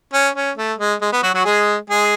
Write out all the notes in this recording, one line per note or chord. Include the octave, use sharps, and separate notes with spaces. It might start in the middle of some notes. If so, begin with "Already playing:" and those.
C#4
C#4
A3
G#3
G#3
B3
F#3 F#4
F#3 F#4
G#3 G#4
G#3 G#4